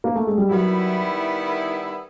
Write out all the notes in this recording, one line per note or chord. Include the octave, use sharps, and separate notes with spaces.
A#3
A3
G#3
G3
D#3 F#3 G3 B3 E4